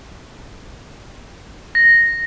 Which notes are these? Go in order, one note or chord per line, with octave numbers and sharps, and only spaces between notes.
A#6